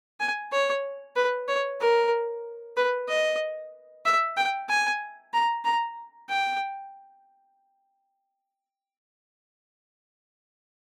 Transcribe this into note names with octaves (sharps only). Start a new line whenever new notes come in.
G#5
C#5
B4
C#5
A#4
B4
D#5
E5
G5
G#5
A#5
A#5
G5